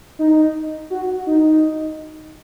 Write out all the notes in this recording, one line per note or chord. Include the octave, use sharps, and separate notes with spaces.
D#4
F#4
D#4